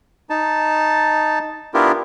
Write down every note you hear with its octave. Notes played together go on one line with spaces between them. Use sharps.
D#4 A5
B3 D4 E4 F4 G4 A#4